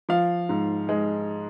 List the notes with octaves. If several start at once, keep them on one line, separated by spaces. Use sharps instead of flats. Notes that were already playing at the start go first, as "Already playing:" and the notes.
F3 F5
G#2
G#3